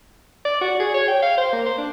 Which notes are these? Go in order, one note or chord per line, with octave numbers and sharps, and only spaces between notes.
D5
F#4
G#4
C#5
G5
F5
C5
A#3
C5
D4